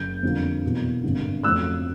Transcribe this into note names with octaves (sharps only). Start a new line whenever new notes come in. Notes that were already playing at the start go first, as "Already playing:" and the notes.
Already playing: F#1 G6
F2 D3 G3 A#3
E2 B2 F#3 A#3
G#1 G2 D3
F2 C#3 F#3 A3 E6 F#6